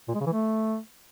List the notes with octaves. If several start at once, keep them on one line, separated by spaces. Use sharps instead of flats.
A#2
G#3
C#3
E3
A3